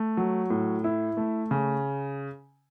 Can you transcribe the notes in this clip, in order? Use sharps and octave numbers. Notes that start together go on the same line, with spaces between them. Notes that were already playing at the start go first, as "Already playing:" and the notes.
Already playing: A3
F#3
A2
E4
A3
C#3